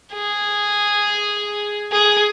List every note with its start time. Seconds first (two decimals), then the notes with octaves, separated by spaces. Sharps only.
0.13 G#4
1.92 G#4